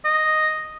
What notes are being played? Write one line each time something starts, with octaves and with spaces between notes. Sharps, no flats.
D#5